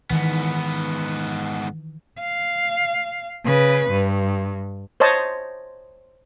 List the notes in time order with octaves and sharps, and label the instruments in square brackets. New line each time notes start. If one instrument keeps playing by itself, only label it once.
[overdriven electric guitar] G#2 B3 [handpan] D#3 E3
[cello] F5
C#3 B4
G2
[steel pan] C5 C#5 D#5 A5